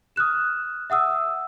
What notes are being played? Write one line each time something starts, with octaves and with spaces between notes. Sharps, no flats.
D#6 F6 F#6 E7
E5 F#5 D#6 E6